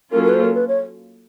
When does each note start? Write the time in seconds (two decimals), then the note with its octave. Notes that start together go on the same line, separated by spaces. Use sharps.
0.12 F#3 A#3 C#4 F4 A4 A#4
0.23 A#4
0.29 B4
0.34 C5
0.44 A#4
0.55 B4
0.68 C#5